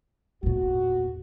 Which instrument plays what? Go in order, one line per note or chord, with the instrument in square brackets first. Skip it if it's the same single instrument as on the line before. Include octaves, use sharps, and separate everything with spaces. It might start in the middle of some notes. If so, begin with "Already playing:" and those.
[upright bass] E2 A#2 [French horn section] F#4